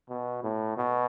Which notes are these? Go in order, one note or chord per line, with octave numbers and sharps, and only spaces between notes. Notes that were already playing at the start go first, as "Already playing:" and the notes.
B2
A2
B2